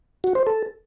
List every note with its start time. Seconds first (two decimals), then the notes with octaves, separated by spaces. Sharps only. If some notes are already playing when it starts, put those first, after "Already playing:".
0.24 F#4
0.35 C5
0.47 A4